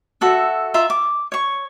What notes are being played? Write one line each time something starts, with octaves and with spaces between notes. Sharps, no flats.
F#4 A4 E5
F4 E5 A#5 C6
D6
C#5 C#6